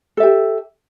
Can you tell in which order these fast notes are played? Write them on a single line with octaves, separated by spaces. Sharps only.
A4 E5 G4